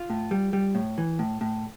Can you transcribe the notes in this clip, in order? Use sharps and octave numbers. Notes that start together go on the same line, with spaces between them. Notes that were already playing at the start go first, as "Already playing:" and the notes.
Already playing: F4
A2
G3
G3
A2
E3
A2
A2